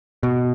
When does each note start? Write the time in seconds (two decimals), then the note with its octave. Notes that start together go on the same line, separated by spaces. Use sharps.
0.23 B2